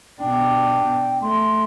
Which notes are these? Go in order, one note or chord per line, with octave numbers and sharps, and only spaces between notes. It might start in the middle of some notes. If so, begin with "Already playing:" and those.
B2 D4 G5
A3 C6